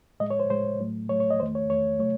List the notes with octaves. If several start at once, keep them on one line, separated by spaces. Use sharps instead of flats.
A2 G#3 D#5
C#5
C5
A2 G#3 C5
A2 F#3 A3
A2 F#3 A3 C#5
C#5
D#5
E2 D#3 A3 C5
C#5
E2 D#3 A3 C#5
C3 F#3 A3 C#5